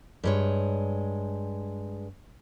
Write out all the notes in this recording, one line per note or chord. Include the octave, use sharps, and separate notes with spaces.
G2 G#3 C#5